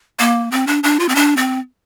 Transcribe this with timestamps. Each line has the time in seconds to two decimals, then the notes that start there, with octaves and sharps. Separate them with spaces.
0.19 A#3
0.51 C4
0.67 D4
0.83 D4
0.99 F4
1.09 C4
1.15 D4
1.37 C4